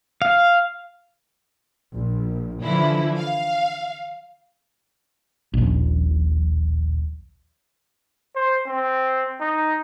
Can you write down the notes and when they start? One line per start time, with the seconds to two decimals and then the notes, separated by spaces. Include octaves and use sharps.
0.22 F5
1.94 A#1
2.62 D3 E3 F3 E4
3.18 F5
5.54 D#1 A#1
8.36 C5
8.66 C4
9.41 D#4